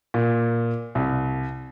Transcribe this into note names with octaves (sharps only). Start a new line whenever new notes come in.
A#2
C2